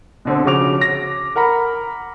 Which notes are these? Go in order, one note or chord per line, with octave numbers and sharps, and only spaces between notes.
B2 D3 C4
C#3 F3 C#4 F#4 D6 F7
A#6
A#4 F#5 A#5 B5